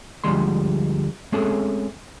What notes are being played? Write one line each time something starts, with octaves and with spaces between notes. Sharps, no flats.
D2 B2 F3 G3 G#3 C6
G#3 A3 C4 C#4 G#4 A4